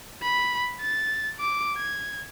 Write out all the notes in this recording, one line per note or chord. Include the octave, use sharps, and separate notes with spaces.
B5
A6
D6
G#6